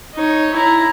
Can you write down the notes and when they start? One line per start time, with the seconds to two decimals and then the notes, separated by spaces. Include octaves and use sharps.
0.14 D#4 C#5
0.53 E4 A#5